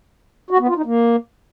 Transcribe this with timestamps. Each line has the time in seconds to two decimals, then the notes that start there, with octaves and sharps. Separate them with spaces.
0.51 F#4
0.59 B3
0.68 F4
0.77 D#4
0.85 A#3